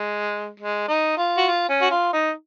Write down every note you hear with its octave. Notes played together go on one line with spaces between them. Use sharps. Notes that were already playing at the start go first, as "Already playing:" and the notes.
Already playing: G#3
G#3
D#4
F4
F#4
F4
C#4
F#4
F4
D#4